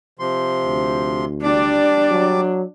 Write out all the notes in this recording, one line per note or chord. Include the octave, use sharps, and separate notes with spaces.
C3 F3 C6
D2
G3 D4 D5 D6
F#3